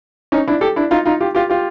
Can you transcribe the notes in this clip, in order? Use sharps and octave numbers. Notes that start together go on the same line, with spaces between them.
C#4 D#4
D4 E4
G4 A4
D4 E4
D#4 F4
D#4 F4
F4 G4
F4 G4
F4 G4